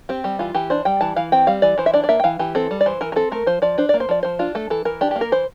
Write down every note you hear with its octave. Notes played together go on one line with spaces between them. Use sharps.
C4 G4
G3 G4
E3 F4
E3 G4
D4 C5
G3 G5
E3 A5
E3 F5
C4 G5
G3 F5
E3 D5
E3 C5
E5
D4 D5
D5
A#3 E5
G5
E3 F5
E3 G4
C4 A4
G3
D5
E3 C5
E3 A#4
A#4
C4 A4
A3 A#4
F3 C5
F3 D5
D4 C5
A#3 D5
C5
F3 D5
F3 C5
D4 F4
A3 A4
E3 A4
E3 A#4
D4 G4
G4
A#3
A#4
E3 C5